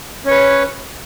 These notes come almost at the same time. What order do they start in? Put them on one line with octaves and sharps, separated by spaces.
C#4 C#5 B4